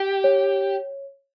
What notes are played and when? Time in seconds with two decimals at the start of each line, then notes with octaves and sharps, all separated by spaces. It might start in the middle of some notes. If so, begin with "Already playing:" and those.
Already playing: G4 G5
0.24 C#5